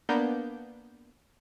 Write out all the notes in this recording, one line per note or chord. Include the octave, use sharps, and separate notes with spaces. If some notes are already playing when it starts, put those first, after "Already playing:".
A#3 B3 D4 G6